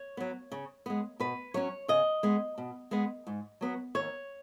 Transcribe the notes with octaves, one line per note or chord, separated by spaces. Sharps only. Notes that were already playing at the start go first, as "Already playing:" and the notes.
Already playing: C#5
F#3 B3
C#3
G#3 B3
B2 B4
F#3 C#4 C#5
C#3 D#5
G#3 B3
B2
G#3 B3
G#2
F#3 B3
D#2 C#5